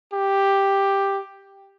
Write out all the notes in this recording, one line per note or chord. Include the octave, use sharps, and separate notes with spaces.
G4